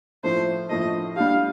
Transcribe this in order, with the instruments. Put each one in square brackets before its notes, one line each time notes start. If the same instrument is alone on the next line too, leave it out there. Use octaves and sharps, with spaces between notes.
[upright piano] A2 F3 A3 [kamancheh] C5
[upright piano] A2 F3 A3 [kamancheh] D#5
[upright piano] G3 D4 G4 [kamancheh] F5